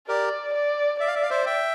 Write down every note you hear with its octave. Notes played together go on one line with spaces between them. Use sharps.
G4 A#4 D5
D5
D5 E5
F5
E5
F5
C5 E5
E5 G5